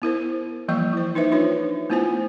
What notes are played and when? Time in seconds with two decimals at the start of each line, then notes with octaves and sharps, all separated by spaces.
0.02 B3 E4 A#4 C5
0.68 E3 F3 G3 A#3 D#5 C#6
0.93 E4 C5
1.15 D#4 B4 C5 E5
1.32 D4 F4 B4 C#5
1.90 A3 B3 E4 F4 C5 G#5